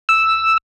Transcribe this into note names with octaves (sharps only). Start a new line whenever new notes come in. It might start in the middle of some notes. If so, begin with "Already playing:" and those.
E6